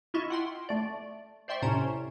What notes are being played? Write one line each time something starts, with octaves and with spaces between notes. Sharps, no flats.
E4 F4 D#5 E5 C#6
F#5 G5 C6
A3 D5
C5 D5 E5 G5 C6 C#6
A2 C3 C#4 A#5 G#6 E7